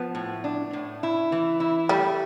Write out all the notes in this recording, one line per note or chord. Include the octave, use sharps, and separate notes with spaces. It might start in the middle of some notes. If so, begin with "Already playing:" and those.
Already playing: F3 B3
A2
D4
A2
E4
E3
E4
G3 A3